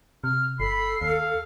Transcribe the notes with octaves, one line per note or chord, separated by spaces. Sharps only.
C3 F6
G1 A4 B5 C7
D#2 F5